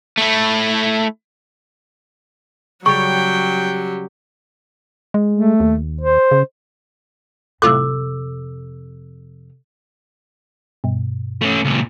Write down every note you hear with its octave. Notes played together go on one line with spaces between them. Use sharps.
A3 E4
C#3 F#3 G3 G4 C#5 G5 C#6
G#3
A3
D#2
C5
C#3
F2 A2 C3 F4 A4 D6 E6 F#6
G2 B2
A3 C#4
C#2 A#2